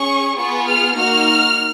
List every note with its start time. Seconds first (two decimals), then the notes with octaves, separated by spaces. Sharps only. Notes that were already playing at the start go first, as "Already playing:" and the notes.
Already playing: C#4 G#4 C#6
0.37 B3 F4 G#4 C#6
0.67 F6
0.97 A#3 D#4 F#4 F6